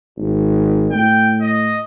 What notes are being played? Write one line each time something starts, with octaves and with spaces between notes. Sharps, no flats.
G#1
A2 G5
D#5